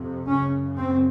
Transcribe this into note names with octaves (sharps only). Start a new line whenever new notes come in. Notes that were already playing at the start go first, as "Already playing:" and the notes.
Already playing: F2 C3
F#2 C#3 C#4
C4